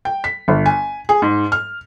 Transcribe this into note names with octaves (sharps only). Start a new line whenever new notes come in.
G5
B6
G1
G#5
G#4
G#2
F6